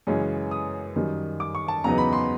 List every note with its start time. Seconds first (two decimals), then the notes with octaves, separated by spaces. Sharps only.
0.07 F#2 C#3 E3 G#3 C#4
0.51 D#6
0.96 F#2 D#3 G3
1.40 D6
1.55 C#6
1.68 A5
1.84 E2 C#3 F#3 B3 D#4 A#5
1.98 B5
2.13 C6